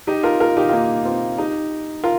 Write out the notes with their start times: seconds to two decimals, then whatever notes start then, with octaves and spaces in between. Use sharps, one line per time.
0.07 D#4 G4
0.23 F4 A#4
0.40 F4 A#4
0.57 D#4 G4
0.69 F4
0.73 A#3 D#4
1.05 C4 F4
1.38 D#4 G4
2.04 F4 A#4